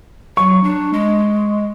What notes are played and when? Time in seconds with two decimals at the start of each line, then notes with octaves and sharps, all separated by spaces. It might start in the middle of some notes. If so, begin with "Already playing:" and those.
0.37 F#3 C#6
0.64 D4
0.93 G#3